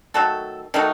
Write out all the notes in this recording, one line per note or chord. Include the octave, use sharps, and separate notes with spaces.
D#3 F#3 A3 A4
D#3 F#3 A3 D#4